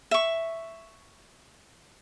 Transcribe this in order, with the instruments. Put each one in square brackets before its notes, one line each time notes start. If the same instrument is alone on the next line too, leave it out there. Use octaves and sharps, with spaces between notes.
[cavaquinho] E5 C#6